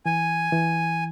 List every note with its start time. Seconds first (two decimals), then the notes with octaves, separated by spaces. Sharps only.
0.06 E3 G#5
0.52 E3